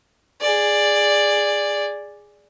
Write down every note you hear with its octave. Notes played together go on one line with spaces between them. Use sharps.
G#4 D5